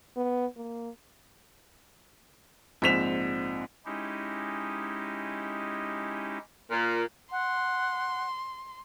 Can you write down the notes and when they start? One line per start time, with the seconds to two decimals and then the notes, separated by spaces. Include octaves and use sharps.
0.17 B3
0.56 A#3
2.82 A#1 G#2 C4 B6 E7 F7
3.85 G#3 C#4 D#4 E4 G4
6.70 A#2
7.32 F#5 C6